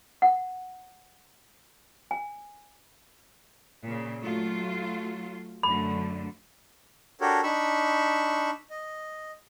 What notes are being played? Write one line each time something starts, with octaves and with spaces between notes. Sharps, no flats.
F#5
G#5
A#2 C#3
F#3 A3 F4
F#2 D3 A3 B5
D4 F#4 G4 A4 A#4 C#5
D4 D#4 B5 C#6 E6
D#5